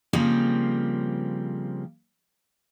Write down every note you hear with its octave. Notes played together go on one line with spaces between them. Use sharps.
C#3 F3 G3 A#3 C4